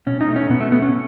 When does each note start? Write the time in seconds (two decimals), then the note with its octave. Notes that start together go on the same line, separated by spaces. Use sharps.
0.07 B2 C#4
0.21 D#4
0.28 A3
0.36 C#4
0.49 B2 B3
0.61 A3
0.72 A3 B3
0.82 C#4